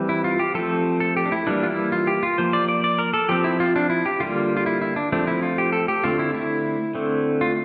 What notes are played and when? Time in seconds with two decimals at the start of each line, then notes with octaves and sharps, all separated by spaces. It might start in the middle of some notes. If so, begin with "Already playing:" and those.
Already playing: E3 G3 C4
0.09 E4
0.24 F4
0.39 G4
0.55 F3 A3 C4 A4
1.00 A4
1.17 G4
1.26 D4
1.32 E4
1.46 E3 G3 A#3 D4
1.63 F4
1.70 E4
1.92 F4
2.07 G4
2.23 F4
2.38 F3 A#3 C5
2.53 D5
2.69 D5
2.84 D5
2.99 A#4
3.14 A4
3.29 F3 C4 G4
3.44 E4
3.60 F4
3.76 D4
3.90 E4
4.06 G4
4.20 D3 G3 A#3 F4
4.57 F4
4.66 E4
4.82 E4
4.96 D4
5.12 F3 A3 C4 D4
5.27 E4
5.43 F4
5.58 G4
5.72 A4
5.88 G4
6.03 D3 A3 C4 F4
6.19 E4
6.34 E4
6.95 D3 A3 C4
7.41 F4